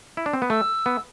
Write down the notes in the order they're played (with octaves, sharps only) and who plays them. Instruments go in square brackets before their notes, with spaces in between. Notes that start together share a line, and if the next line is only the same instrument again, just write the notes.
[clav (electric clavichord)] E4
D4
C4
B3
[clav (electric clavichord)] A3 [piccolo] E6
[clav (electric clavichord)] B3